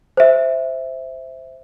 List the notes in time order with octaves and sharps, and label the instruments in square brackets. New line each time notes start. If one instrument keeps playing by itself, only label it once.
[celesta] C5 E5